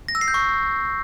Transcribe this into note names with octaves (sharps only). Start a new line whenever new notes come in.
A#6
E6
C7
G6
C#6